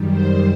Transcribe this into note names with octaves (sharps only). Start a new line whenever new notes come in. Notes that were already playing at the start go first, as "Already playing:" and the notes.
Already playing: F#2 D#3 G3
C5